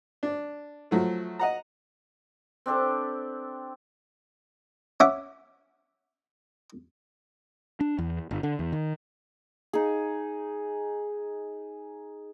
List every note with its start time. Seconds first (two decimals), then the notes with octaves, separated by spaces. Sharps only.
0.23 D4
0.91 F3 F#3 A3
1.39 D#5 F#5 A#5
2.66 C4 D4 G4 A4
5.00 C#4 E5 F#5 D6
7.81 D4
7.99 E2
8.31 G1
8.43 D3
8.59 E2
8.72 D#3
9.73 D#4 G#4